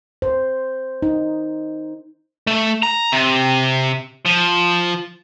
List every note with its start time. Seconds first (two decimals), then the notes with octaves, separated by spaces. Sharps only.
0.22 C5
1.02 D#4
2.47 A3
2.82 A#5
3.12 C3
4.25 F3